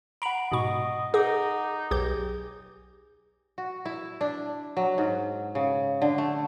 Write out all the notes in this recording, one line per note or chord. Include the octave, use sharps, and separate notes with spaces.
F#5 A#5 B5 D7
G#2 B2 D#5 C#6
D#4 G#4 F#5 D6
B1 G4 G#4 G6
F#4
E4
D4
F#3
G#2
C#3
D3
A3